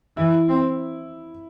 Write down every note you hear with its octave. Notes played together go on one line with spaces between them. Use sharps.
E3 E4
C4